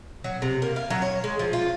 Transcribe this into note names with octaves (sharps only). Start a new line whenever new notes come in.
F#3
C3
A#3
F5
F#3
C#5
G#3
F3
F4